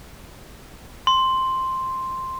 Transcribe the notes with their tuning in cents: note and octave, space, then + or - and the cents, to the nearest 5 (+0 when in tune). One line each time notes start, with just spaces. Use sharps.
C6 +0